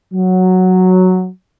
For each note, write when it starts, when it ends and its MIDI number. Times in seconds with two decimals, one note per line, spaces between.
0.13 1.28 54